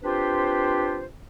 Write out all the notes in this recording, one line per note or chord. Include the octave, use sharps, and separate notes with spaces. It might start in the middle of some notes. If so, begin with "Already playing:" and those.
C4 D4 F4 G4 B4 C5